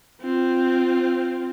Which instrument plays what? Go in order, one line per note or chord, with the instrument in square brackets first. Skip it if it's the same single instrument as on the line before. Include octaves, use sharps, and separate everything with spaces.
[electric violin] C4 F4